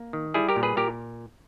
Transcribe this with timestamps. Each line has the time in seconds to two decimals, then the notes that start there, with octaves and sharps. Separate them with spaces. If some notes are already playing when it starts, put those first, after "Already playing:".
Already playing: A#3
0.13 D#3
0.34 G3 E4 G#4
0.49 G4 A#4
0.56 A#2
0.63 G#4 B4
0.77 A#2 G4 A#4